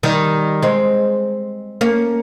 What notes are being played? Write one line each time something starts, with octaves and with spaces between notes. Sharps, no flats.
D#3 G3
G#3 C4
A#3 C#4